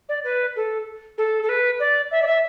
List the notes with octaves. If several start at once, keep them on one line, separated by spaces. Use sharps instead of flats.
D5
B4
A4
A4
A4
B4
D5
E5
D5
E5